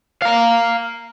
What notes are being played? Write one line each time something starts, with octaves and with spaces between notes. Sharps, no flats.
F5 A#5